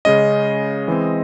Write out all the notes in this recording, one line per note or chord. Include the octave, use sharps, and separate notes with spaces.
C#3 G#3 C#4 D#5
E3 G#3 C4